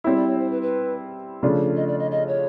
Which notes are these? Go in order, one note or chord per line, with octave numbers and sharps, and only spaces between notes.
G3 C4 E4 C#5
D5
C#5
C5
B4
B4
C#3 F3 A3 D4 F4
D#5
D5
D#5
D#5
C#5